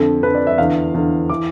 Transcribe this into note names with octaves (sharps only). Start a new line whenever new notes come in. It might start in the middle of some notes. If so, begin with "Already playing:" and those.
Already playing: F2 D3 A4
F2 D3 B4
D5
E5
E2 D3 F5
E2 D3
E3 D6